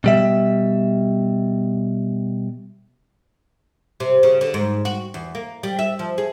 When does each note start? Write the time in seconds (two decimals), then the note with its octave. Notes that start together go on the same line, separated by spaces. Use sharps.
0.04 B2 G3 E5
4.00 C3
4.23 C#3
4.41 D3
4.54 G#2
4.85 F#4
5.14 E2
5.35 A#3
5.63 G3
5.79 E5
5.99 F3
6.18 G#4